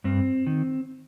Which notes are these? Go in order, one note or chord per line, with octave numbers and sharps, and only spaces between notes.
G2 C4
D#3